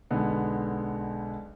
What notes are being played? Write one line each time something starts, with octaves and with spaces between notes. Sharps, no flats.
B1 D3 G#3 B3